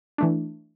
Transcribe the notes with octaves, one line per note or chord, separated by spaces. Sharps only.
E3 A3 D4